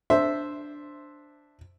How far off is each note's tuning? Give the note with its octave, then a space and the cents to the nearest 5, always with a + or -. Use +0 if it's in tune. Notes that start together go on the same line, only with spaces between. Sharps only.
D4 +0 C5 +0 E5 +0